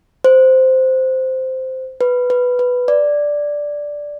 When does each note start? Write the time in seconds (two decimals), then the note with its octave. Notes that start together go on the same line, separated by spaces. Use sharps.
0.24 C5
2.01 B4
2.30 B4
2.59 B4
2.88 D5